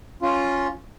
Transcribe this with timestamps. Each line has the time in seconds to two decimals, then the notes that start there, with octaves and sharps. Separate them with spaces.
0.22 C#4 F4